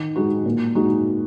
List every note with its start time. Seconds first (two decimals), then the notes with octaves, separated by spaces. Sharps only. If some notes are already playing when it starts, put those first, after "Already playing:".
Already playing: D#3
0.16 G#3 D#4 F#4
0.46 A#2
0.75 G#3 D#4 F#4